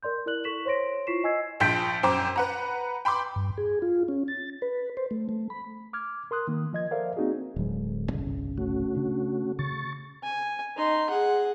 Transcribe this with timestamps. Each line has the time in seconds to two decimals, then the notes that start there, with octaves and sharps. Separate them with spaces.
0.03 A#4 D5 C6 G6
0.26 E4 A#4 D5 F#6 F#7
0.44 E4 A4 C#6 B6 E7 F#7
0.65 C5 C#5 C6 A#6 D7
1.07 E4 F4 C#6 B6 C7 E7
1.24 D#5 G#5 E6 G#6 C7
1.60 A#1 F3 G5 G6 B6 D7
2.03 F#2 C5 G5 A#5 D6
2.36 B4 F#5 A#5
3.05 G5 B5 C6 D6
3.36 G2
3.58 G#4
3.82 F4
4.08 C#4
4.28 A6
4.62 B4
4.97 C5
5.11 A3
5.29 A3
5.50 B5
5.93 D6 F6 G#6
6.31 A#4 C6 D#6 F#6
6.48 D#3 A#3
6.73 F3 D#5 G#6
6.91 A4 A#4 C5 D5 E5 F5
7.17 A#3 C4 D#4 F#4 G#4
7.56 D1 F#3 G#3
8.11 G1 C2 C#3
8.58 A3 C#4 F#4
8.95 C#3 D4
9.59 C#3 C#6 A6
10.23 G#5
10.77 D#4 C6
11.10 G#4 F#5